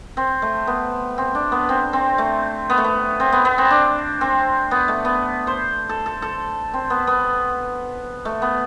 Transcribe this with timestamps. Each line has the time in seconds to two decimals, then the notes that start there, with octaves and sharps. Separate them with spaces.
0.17 C4
0.42 A3
0.67 B3
1.18 C4
1.35 D4
1.52 B3
1.69 C4
1.93 C4
2.18 A3
2.70 B3
2.78 A3
2.84 B3
3.20 C4
3.32 B3
3.45 B3
3.58 C4
3.70 D4
4.21 C4
4.71 B3
4.88 A3
5.05 B3
5.47 C5
5.89 A4
6.06 A4
6.22 A4
6.74 C4
6.90 B3
7.07 B3
8.25 A3
8.42 B3